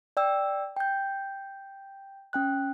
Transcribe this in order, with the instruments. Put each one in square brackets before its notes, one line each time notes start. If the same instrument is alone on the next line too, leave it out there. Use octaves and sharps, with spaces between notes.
[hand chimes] D5 G5 E6
G5 G6
C#4 G5 F#6